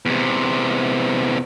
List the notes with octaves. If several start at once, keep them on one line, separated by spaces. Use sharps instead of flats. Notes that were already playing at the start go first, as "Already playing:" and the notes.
E2 C3